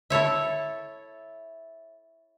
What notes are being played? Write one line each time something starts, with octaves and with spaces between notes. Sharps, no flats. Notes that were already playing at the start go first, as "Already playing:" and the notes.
E4 A4 C#5 E5